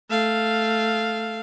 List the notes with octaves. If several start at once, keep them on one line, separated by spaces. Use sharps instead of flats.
A3 F5